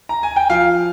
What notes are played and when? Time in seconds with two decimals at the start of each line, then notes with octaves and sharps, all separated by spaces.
0.09 A#5
0.23 G#5
0.36 G5
0.50 F3 F5